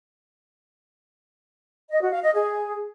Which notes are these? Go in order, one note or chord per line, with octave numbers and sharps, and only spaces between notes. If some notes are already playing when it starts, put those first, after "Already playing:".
D#5
F#4
F5
D#5
G#4